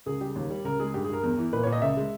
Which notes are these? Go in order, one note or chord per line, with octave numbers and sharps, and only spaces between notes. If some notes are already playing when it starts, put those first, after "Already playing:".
C#2 G#4
G3 G4
D#2
G3
C#2 A#4
G#3 G#4
G2 G4
G#4
G2 A#4
E2
E3
A#2 B4
A#2 C#5
D#5
C#2 E5
G#3